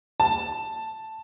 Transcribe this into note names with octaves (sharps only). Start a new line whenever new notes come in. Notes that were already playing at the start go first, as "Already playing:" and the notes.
A5